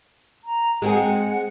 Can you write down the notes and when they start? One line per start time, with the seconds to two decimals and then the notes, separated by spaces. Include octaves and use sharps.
0.44 A#5
0.82 G#3 C4 G#4 F#5